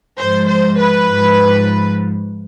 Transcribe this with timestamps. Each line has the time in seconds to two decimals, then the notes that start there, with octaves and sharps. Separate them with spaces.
0.18 G#2 F3 C5
0.48 C5
0.79 B4
1.09 G#2 F3